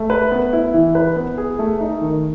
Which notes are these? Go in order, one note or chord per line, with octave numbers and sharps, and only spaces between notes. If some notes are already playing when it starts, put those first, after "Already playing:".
Already playing: A3
B4
B3
E4
E3
B4
B3
G#4
A3
D#4
D#3